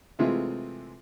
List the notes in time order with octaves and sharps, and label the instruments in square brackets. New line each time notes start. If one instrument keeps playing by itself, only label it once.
[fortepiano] C3 E3 G#3 A3 C4 F4